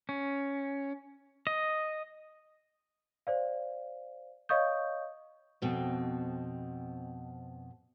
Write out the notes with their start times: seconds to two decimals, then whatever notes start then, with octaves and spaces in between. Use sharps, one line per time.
0.09 C#4
1.47 D#5
3.27 C5 D5 F5
4.49 C#5 D#5 F5 C#6 D#6 G6
5.62 F2 B2 C4